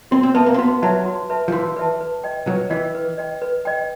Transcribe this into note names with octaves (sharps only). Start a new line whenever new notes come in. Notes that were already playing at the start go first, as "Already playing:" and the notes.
C4 F#4
C4
B3 B4 E5 A5
A#3
C4
B3 F#4
F#3 B4 E5 A5
F#4
B4 E5 A5
F3
E3 F#4
B4 E5 A5
B4
D#5 G5
F#3 B4
E3 D#5 G5
B4
D#5 G5
B4
D#5 G5